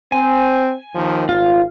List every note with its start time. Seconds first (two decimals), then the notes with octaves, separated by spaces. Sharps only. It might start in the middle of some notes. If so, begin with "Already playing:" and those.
0.12 C4 G#5
0.94 D#2 D#3 F3
1.29 G#1 F4